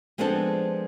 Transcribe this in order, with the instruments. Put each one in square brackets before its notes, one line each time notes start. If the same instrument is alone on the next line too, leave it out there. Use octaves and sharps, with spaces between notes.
[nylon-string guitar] F3 G#3 B3 C4 D4 A4